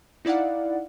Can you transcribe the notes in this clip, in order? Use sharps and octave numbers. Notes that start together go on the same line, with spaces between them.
D#4 E4 D5 F5 F#5